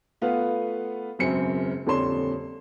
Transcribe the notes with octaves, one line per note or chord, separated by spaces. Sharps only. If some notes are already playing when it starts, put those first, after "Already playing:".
A3 B3 F4 B4 F5 F#5
E1 F#2 C#3 C4 C#7
D#1 F2 D3 C#5 C6 E7